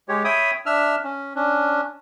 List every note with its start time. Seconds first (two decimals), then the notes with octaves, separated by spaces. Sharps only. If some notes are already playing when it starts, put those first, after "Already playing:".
0.09 G#3 G4 C#5
0.24 C#5 E5 G5 B5 D#6
0.66 D4 E5 E6 F6
1.03 C#4
1.35 C#4 D4